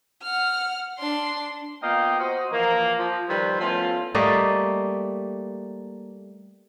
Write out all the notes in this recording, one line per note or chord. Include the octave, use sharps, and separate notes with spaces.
F#5 F6
D4 C6
A#3 B3 F4 D#5 F5 G5
F#4 C5 D#5
A#2 E3 F3 A#3
F3
D#3 F3 G3 A4 B4 C5
F3 A3 B3 C#4 E4 F4
G3 A3 A#3 D#5